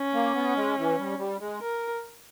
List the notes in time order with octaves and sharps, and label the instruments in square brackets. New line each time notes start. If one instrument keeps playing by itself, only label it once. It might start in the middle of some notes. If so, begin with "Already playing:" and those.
Already playing: [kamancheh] C#4
[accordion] A#3
B3
G#3
E3
G3
G3
G#3
[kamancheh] A#4